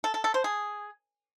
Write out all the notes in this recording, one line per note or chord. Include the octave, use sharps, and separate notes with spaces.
A4
A4
A4
C5
G#4